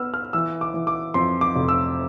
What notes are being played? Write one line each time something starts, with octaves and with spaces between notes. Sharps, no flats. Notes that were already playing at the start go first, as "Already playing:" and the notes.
Already playing: B3 E6 F6
F6
E3 E6
D6
E3
D6
F2 C6
D6
F1
E6